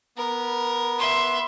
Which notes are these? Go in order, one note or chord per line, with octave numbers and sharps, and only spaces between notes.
B3 A#4
E5 C6